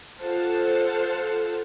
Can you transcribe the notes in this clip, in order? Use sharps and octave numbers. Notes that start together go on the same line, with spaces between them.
F4 A4 C5 F5 F#5 A5